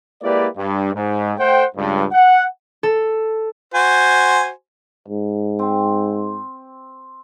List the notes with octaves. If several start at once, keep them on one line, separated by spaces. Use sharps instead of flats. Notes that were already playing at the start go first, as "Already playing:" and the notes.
G#3 A#3 E4 G4 B4 D5
G2
G#2
A3 C5 F#5 G5
C#2 G2
F#5
A4
F#4 C5 G#5
G#2
C4